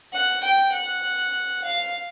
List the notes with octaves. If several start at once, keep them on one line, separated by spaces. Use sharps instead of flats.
F#5
G5
F#5
F5